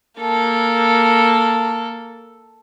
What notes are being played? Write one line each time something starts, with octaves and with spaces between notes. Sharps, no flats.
A#3 A4